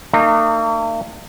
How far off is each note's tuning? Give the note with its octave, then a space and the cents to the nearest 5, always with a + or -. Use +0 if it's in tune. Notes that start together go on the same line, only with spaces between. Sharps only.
A#3 -45 D#4 -35